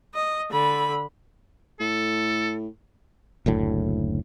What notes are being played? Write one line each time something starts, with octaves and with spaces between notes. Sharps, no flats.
D#5
D3 B5
A2 A4
F#1 D2 A2